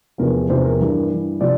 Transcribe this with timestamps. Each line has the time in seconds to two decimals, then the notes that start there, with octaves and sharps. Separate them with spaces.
0.18 E2 C3 F3 A#4
0.49 E2 C3 F3 C5
0.64 A#4
0.80 G2 E3 A#4
1.11 G2 E3
1.41 C3 F3 D5